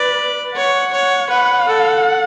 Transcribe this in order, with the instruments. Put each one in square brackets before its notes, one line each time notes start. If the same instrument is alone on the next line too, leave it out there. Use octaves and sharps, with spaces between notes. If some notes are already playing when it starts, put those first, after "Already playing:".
Already playing: [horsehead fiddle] B4 [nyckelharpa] D5
[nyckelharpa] C#5 [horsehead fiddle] F#5
[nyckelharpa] C#5
[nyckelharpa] B4 [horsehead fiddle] F#5
[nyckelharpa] A4